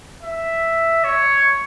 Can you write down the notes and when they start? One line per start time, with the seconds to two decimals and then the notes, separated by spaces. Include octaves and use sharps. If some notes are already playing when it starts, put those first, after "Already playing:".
0.23 E5
1.04 C#5